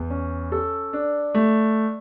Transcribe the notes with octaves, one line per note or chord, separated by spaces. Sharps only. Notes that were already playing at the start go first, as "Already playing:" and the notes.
Already playing: E2
C#4
A4
D4
A3